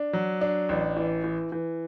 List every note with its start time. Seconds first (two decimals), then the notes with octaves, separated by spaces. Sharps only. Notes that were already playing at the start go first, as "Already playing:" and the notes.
Already playing: D4
0.13 F#3
0.41 D4
0.69 A1
0.97 E3
1.24 E3
1.52 E3